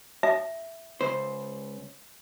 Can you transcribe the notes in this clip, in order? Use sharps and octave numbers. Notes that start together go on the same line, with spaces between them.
E5
C#2 C5